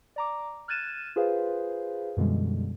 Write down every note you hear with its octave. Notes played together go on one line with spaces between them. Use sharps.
D5 A#5 D6
F6 F#6 G#6 A6 D#7 E7
F4 G#4 B4 C5 F5
F#2 B2 D3 E3 G3 G#3